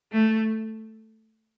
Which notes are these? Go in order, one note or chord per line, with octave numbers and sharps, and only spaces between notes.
A3